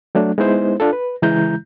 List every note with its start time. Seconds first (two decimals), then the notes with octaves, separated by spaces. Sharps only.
0.15 F#3 A3 D4
0.38 G#3 B3 D#4 E4 C5
0.80 D4 F4 A4
0.93 B4
1.22 C#3 E3 G#3 E4 A#5 G6